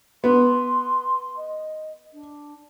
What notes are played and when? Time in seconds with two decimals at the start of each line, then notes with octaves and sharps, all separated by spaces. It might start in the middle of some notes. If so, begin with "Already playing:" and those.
0.24 B3 C6
1.36 D#5
2.13 D4